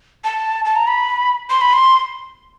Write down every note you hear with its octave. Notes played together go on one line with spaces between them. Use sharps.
A5
A5
A#5
B5
C6
B5
C6